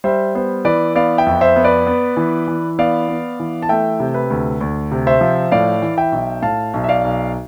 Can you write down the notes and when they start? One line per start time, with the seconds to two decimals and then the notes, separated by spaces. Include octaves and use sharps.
0.04 G3 C5 E5
0.35 B3 C5
0.65 E3 B4 D5
0.95 B3 D5 F5
1.18 E5 G5
1.27 F2
1.41 C5 E5
1.56 B3
1.64 B4 D5
1.87 B3
2.17 E3
2.48 E3
2.79 B3 D5 F5
3.08 B3
3.40 E3
3.62 A5
3.69 A3 E5 G5
4.00 C3
4.14 B4
4.30 D2
4.61 D2
4.91 C3
5.07 C5 E5
5.21 F3
5.52 A2 D5 F5
5.82 E3
5.98 E5 G5
6.12 B1
6.43 A2 F5 A5
6.74 B1
6.84 E5
6.89 D5 F5
7.04 B1